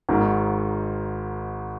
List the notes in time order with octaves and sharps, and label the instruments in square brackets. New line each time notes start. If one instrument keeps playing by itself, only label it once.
[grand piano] G#1 G#2 D#3